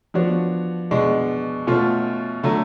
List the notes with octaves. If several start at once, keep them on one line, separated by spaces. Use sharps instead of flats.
F3 B3 D4 F#4 C#5
B2 G#3 B3 D4
B2 A3 C#4 F4
D3 F#3 A3